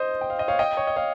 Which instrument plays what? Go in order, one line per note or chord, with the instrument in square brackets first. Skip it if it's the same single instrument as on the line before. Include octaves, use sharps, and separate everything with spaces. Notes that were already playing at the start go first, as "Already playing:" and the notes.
Already playing: [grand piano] C5 D#5
G5
F5
D#5
C#5 F5
D#5 G5
C#5
D#5
C#5 F5